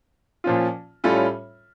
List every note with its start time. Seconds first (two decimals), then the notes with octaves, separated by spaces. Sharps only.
0.44 A#2 F3 C#4 F4
1.04 A2 G3 C#4 F4 A4